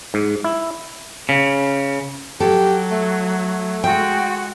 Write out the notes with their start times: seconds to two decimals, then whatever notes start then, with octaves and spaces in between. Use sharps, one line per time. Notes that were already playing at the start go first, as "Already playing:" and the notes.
0.14 G#2
0.44 E4
1.29 C#3
2.40 F#3 G4 A4
2.91 A3
3.84 G#3 F#4 G5